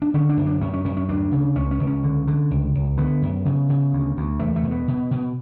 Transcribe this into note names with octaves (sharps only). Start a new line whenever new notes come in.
D4
D3 C#4
D4
F#2
D4
F#2 C#4
C#4
F#2 C#4
C#4
D2 D4
C#3
C#2 C#4
C#4
C#2
C#4
D3
D3
C#2
C#2
D3 B3
F#2
C#3
C#3
D2
D2
E2 A3
A3
B2
B3
B2
B2